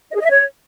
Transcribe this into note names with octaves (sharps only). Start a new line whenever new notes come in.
D#5
G#4
D#5
E5
C#5